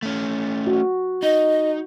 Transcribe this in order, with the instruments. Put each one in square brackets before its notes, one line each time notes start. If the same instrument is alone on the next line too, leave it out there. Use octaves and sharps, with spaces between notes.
[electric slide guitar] A3 C#4
[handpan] F#4
[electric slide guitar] D#4 [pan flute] D#5